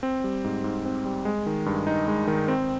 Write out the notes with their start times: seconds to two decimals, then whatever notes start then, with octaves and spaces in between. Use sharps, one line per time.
0.03 C4
0.24 G3
0.44 G#2
0.64 G#2
0.85 C4
1.05 G3
1.25 G#3
1.46 D#3
1.66 G2
1.87 D#4
2.08 G#3
2.27 D#3
2.48 C4